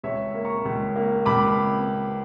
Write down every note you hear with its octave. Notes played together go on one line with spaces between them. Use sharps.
C#2 C#5 E5
A#3
A#5 C#6
C#2
A#3
C#2 B5 D6